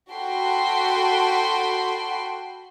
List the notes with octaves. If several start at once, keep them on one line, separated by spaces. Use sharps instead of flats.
F#4 A4 G5 B5 C6